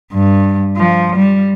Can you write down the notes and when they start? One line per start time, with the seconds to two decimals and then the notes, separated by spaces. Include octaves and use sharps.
0.13 G2
0.76 F3
1.16 G3